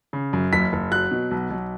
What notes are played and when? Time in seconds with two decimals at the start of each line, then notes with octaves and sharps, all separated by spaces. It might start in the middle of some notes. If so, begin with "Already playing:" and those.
0.13 C#3
0.33 F#2
0.53 F#1 B6
0.73 F#1
0.91 F#3 F#6
1.11 B2
1.31 B1
1.50 B1